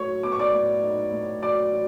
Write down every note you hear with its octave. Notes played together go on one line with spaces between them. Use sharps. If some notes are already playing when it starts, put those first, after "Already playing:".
Already playing: A2 F#3 C#5 C#6
B3 D6
C#6
D5 D6
A2
D#4
A2
F#3 D5 D6
F#3